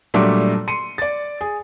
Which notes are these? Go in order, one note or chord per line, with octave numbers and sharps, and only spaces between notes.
A#2 F#3 G3 A3 D4
C6 C#7 D#7
D5 A6
G#4